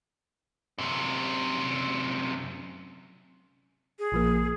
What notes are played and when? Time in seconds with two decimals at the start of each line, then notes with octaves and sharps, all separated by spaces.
0.78 F#2 C3
3.99 G#4
4.12 A#1 F3 A#3